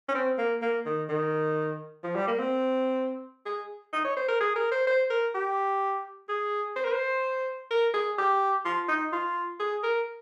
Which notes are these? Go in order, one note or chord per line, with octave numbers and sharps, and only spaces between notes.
C#4
C4
A#3
A#3
D#3
D#3
F3
G3
A#3
C4
G#4
D#4
C#5
C5
A#4
G#4
A#4
C5
C5
A#4
G4
G#4
C5
A#4
C5
A#4
G#4
G4
F4
D#4
F4
G#4
A#4